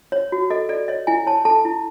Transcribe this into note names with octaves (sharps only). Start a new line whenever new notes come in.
C#5
F#4
A4 D#5
A4 D5
C#5 D#5
E4 G#5
C#5 A5
A4 A5
E4